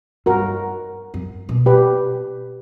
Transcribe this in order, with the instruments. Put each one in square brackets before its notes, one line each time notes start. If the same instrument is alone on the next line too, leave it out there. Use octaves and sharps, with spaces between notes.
[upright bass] G2 [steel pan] F#4 A#4
[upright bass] F#2
B2
[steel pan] G4 B4